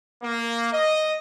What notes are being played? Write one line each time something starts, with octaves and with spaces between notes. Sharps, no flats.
A#3
D#5